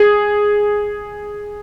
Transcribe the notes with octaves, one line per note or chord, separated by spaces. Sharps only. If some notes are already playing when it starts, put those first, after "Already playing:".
Already playing: G#4